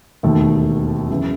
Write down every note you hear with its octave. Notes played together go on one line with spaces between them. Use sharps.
E1 D#2 D#3 A3 D#4
F#2 C#3 E3